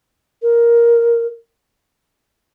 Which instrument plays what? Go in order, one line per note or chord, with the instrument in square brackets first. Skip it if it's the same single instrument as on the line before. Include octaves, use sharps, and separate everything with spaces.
[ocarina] A#4